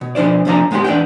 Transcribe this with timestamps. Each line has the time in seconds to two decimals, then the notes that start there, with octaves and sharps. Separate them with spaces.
0.01 B2
0.15 B2 F3 D4 C5 D5
0.45 C2 F#2 F3 D4 F5 A#5
0.71 A2 G#3 B3 D#4 G4 C6
0.84 E2 D4 B4 D5 F#5 G5